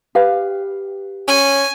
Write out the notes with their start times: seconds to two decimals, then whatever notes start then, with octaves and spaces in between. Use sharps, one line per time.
0.15 G4 B4 F5
1.28 C#4 G#5